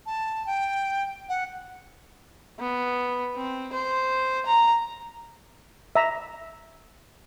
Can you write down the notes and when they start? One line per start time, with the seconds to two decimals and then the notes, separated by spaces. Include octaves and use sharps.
0.06 A5
0.46 G5
1.29 F#5
2.60 B3
3.37 C4
3.73 C5
4.46 A#5
5.96 E5 A#5